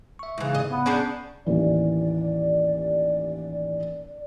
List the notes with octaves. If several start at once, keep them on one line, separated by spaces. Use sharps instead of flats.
E5 C#6
G#2 C#3 E3
G#2 C3 D#5
B3
C#4 D4 G#4 D5 A#5 G6
A1 D#2 E3 D5